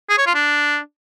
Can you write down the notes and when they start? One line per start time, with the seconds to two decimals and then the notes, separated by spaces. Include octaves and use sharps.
0.10 G#4
0.18 C#5
0.26 F4
0.35 D4